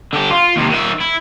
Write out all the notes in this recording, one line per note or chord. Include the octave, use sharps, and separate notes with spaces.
D3 G4
F4
D#2 C3
D#3 E5
E4